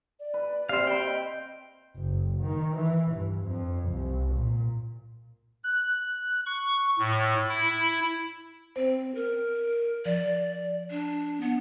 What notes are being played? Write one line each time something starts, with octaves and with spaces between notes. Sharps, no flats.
D5
B4
C3 C4 C5 F5
C4 G5 B5
D#5
F#1
D#3
E3
G2
F2
C2
A#2
F#6
C#6
A2
E4
C4 C5
A#4
F3 D5
D4
B3